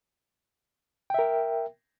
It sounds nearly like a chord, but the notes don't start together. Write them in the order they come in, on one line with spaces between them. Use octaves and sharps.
G5 E5 A#4